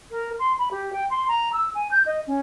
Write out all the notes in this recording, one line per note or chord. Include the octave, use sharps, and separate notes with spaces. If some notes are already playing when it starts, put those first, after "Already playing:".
A#4
C6
B5
G4
G5
C6
A#5
E6
G#5
G6
D#5
C#4